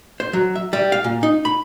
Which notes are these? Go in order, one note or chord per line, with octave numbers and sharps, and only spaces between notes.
C5
F#3
E5
G3
F5
A#2
D#4
B5